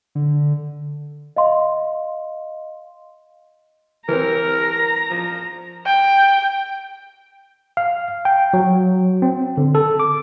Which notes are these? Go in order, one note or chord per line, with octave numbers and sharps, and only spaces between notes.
D3
D#5 F5 C6
E3 C4 A#4 A#5
F3
G5
F5
G5
F#3
C4
D3
A4
D6